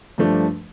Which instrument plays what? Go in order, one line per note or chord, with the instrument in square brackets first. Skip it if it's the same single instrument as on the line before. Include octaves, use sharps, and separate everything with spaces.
[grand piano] G2 F3 A3 D4